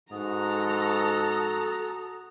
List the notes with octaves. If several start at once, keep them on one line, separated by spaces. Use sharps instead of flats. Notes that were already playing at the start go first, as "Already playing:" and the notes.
G#2 F#4 A4 A#5 D#6